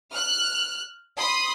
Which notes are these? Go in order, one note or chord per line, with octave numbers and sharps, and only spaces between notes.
F6 F#6
B5 C6 D#6